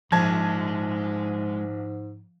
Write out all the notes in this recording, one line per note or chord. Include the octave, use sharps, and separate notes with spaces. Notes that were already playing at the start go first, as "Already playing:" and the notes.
A#1 G#2 F3 G#3 A5 G#6